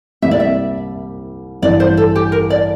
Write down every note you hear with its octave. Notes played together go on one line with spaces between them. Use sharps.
C2 C3 G3 A#3 E5
D5
E5
A1 G2 E3 G3 D5
C5
A4
G4
A#4
D5